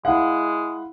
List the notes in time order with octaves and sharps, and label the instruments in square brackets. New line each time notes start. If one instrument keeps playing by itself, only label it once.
[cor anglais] G#3 [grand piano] E4 F5 F#5